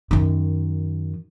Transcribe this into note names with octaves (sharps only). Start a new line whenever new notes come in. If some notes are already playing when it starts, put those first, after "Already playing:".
F#2 D#3